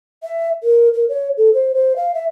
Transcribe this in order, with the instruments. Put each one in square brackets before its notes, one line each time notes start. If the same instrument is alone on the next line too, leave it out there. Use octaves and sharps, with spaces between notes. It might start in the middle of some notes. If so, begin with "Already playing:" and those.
[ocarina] E5
A#4
A#4
C#5
A4
C5
C5
F5
E5